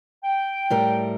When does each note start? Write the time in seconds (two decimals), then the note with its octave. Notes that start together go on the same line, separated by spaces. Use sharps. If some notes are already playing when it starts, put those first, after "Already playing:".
0.24 G5
0.70 A2 G3 A#4